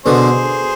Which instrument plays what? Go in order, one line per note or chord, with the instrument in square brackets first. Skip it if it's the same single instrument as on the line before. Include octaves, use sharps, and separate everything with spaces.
[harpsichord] B2 D3 [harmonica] G#4 C5